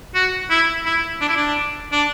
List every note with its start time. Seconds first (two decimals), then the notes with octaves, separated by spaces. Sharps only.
0.15 F#4
0.50 E4
0.85 E4
1.21 D4
1.29 E4
1.37 D4
1.92 D4